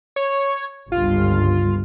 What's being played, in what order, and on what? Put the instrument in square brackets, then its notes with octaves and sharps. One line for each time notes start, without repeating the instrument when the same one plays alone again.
[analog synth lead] C#5
[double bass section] G1 C#2 G2 [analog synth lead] F4